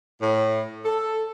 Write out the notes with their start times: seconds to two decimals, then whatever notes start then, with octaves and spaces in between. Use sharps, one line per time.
0.21 A2
0.84 A4